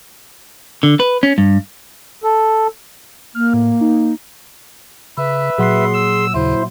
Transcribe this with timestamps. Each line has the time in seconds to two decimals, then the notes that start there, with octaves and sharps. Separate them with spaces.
0.83 D3
1.00 B4
1.23 C#4
1.38 G2
2.24 A4
3.35 A#3 F6
3.53 A2
3.81 D#4
5.18 C#3 B4 E5
5.58 A#2 F#3 G#4 F#5 C6 C7
5.94 E6
6.34 D#2 C#3 E4 C5